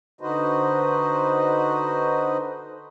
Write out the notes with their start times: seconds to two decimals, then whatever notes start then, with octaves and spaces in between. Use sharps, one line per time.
0.21 D3 D#4 F#4 B4 C5 D#5